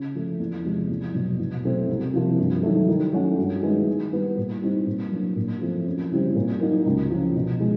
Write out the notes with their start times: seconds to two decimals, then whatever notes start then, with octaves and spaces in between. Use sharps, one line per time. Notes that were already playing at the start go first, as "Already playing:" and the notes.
Already playing: C#3
0.15 F3 A3
0.39 E2
0.65 C3 F3 G#3
0.89 E2
1.14 B2 F#3
1.39 B2
1.64 F#3 A3 C4
1.89 C2
2.13 C3 F3 A#3
2.38 G2
2.63 D#3 F#3 A3
2.88 D#3
3.13 F#3 A3 C#4 F#4
3.38 G2
3.63 D#3 G#3 B3 E4
3.87 D#3
4.13 G3 B3
4.37 A#2
4.62 G3 C4 D#4
4.86 A#2
5.12 F#3 A#3 D4
5.36 A#2
5.61 F3 A3 C4
5.86 F#2
6.11 C#3 E3 G3 C4
6.35 A#2
6.61 F#3 A#3 D#4 F#4
6.86 C#2
7.10 C#3 F3
7.35 B2
7.60 G#3